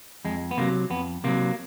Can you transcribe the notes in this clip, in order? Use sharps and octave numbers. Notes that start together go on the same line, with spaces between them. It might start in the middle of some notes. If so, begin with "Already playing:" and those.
F2 G#3
B3
C3 D#3 F#3 A#3
F2 B3
C3 D#3 F#3 A#3